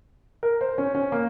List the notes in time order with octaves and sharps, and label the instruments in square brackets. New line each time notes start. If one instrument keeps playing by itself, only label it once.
[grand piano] A#4
C5
C#4
C#4
A#3